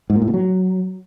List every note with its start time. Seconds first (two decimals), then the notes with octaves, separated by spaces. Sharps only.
0.10 G#2
0.16 A#2
0.22 A2
0.28 B2
0.34 F#3